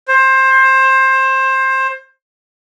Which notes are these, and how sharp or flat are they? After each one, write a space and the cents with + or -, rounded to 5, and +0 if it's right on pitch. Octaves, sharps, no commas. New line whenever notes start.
C5 +20